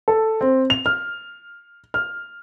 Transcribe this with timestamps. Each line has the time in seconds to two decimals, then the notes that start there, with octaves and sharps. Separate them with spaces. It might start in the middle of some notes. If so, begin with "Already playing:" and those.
0.08 A4
0.41 C4
0.70 F7
0.86 F6
1.94 F6